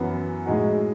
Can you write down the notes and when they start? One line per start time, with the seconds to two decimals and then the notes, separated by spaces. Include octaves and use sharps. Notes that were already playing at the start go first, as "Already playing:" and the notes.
Already playing: F#2 E3 B3
0.45 A2 G#3 D#4 F#4